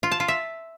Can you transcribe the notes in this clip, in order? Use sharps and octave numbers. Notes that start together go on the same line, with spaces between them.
F4
A5
F4
E5